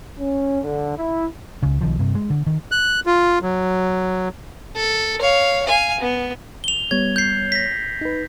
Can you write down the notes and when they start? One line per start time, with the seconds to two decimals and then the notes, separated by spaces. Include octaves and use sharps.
0.18 C#4
0.63 D3
0.96 E4
1.62 C#2 C#3
1.81 B1 D#3 F3
1.99 G2 C3
2.15 G#3
2.30 D3
2.46 D#3
2.72 F#6
3.06 F4
3.42 F#3
4.75 A4
5.21 C#5 F5
5.66 F5 G#5
6.00 B3
6.64 F7 G7
6.91 G3 B3 C#5 G#6
7.16 G6 C7
7.52 A#6 B6
8.01 D#4 B4